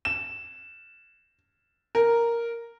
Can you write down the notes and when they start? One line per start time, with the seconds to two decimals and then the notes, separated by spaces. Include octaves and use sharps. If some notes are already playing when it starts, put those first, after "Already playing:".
0.05 E7
1.95 A#4